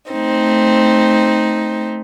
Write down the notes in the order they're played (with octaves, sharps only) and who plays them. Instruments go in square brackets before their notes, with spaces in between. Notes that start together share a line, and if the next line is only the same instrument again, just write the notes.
[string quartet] A3 C4 D#4